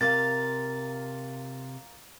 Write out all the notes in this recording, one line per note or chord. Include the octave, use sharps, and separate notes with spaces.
C3 A#3 F4 A6